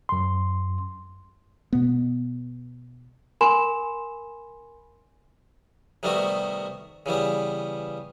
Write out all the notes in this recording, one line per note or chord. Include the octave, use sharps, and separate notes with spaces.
F#2 C6
B2 B3
A#4 G#5 B5 C6 E7
C3 D#3 G3 A3 B3 F#4
C#3 E3 G3 B3